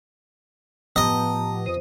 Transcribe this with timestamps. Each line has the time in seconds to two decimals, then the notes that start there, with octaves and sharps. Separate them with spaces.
0.96 A2 F3 B3 G4 D#5 A5 A#5
1.66 F2 C5 D#6